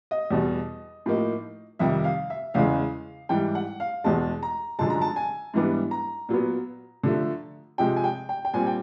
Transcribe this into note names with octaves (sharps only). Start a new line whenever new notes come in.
D#5
E2 B2 G3
A2 F3 A#3 D#4
F2 C3 D#3 G3 E5
F5
E5
E2 C#3 E3 G#3 F5
G#2 E3 G3 G5
F#5
F5
E2 B2 G#3 A5
A#5
F#2 D3 F3 G#3 A5
A#5
A5
G#5
G#2 E3 G3 B3 D4
A#5
A#2 F#3 B3
D3 F3 A3
C3 F3 G#3 G5
G#5
G5
G5
G5
A#2 G3 C4 G#5
G5